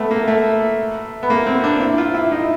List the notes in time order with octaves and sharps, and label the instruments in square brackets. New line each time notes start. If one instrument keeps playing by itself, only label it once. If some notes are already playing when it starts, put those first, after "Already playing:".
Already playing: [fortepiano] A3 B3
A#3
A3
B3
A#3
C4
D4
E4
F4
E4
D#4